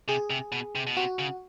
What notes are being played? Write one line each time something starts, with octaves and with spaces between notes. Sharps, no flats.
C3 G#4
C3
B2
C3
B2
C3 F#4
C#3